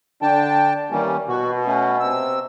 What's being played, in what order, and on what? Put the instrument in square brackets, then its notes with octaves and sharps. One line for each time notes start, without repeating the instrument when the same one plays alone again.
[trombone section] D3 D4 [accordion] G5 A5
[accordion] D#3 A#3 C#4 [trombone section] E3 G3
[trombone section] B2 [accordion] F#4
[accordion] A3 C#4
C3 E6